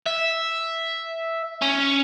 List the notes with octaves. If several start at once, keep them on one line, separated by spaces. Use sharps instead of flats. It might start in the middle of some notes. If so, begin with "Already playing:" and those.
E5
C#4